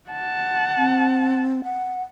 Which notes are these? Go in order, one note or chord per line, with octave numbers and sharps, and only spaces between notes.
F#5 A5
C4
F#5